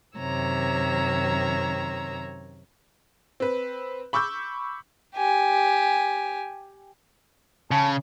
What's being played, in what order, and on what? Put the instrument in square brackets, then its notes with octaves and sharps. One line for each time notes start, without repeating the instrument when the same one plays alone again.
[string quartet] F#2 C3 D#3 C#5 A#5 E6
[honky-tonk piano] C4 B4
B5 C#6 D6 E6 G6
[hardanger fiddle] G4 G#5
[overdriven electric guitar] C#3 [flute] A5